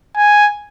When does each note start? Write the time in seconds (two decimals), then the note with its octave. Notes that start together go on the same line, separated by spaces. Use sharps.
0.16 G#5